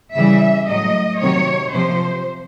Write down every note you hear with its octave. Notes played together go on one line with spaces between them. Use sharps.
C#3 E3 G3 E5
A2 F#3 D#5
C3 D#3 F#3 C#5
C3 F3 C5